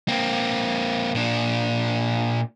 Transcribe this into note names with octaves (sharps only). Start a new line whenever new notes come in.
A#3 C4
A#2 D4